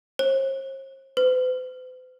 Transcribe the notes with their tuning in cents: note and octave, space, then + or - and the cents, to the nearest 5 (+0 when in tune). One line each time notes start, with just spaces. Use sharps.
C5 +45
C5 -45